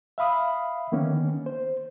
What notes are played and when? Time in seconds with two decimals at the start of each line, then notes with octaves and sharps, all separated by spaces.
0.18 E5 F5 B5 D#6
0.92 D3 D#3 A#3 B3 C#4
1.46 C5